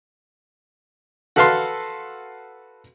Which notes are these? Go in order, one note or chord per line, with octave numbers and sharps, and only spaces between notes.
F#4 A4 B4 F5 A5 C6